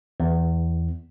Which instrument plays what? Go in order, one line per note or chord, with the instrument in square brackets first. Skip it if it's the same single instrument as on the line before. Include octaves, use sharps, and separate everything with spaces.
[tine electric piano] E2